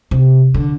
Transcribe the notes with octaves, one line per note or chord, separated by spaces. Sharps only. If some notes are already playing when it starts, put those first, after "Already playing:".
C3
D3